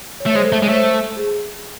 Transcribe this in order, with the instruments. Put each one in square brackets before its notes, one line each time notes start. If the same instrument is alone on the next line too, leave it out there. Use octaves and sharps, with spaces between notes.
[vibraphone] C#5
[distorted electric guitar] A3
[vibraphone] C5
[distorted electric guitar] G#3
[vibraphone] A4
[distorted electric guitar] A3
[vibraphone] C#5
[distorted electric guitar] G#3
[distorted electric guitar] A3 [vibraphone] C5
[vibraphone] A4
G#4